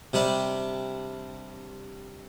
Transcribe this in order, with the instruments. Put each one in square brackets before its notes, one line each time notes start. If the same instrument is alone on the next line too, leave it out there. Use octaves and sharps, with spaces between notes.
[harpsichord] C3 G3 D4